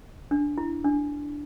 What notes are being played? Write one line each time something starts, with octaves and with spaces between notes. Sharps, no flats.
D4
E4
D4